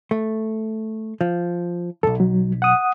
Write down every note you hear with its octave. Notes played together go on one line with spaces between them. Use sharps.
A3
F3
B1 E2 A4
F#3
F#5 D#6